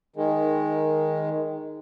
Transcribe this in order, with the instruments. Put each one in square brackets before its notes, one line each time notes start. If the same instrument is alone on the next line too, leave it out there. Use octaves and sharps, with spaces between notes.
[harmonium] D#3 G#3